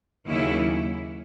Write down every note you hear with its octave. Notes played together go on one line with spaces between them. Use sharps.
D#2 C#3 F#3 A#3 C#4 E4